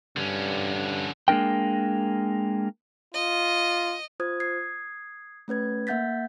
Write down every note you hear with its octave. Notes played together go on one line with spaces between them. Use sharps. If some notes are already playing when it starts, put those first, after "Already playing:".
G2 D3 C#4
G#3 A#3 D4 A#4 G5
F4 D#5
F4 C5 D#6 G#6
D#6 G#6 C7
A3 C#4 B4 G#6
A#3 E5 F#5 G6 A6 B6